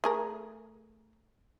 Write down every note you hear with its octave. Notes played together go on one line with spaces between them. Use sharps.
A3 G#4 A#4